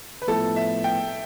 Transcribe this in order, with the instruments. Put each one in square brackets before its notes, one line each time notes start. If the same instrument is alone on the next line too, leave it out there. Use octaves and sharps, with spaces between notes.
[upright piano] B4
[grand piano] A2 F3 B3 E4 [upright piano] A4
[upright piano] E5
G5